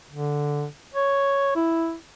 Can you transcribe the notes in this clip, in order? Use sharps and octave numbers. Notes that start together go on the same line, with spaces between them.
D3
C#5
E4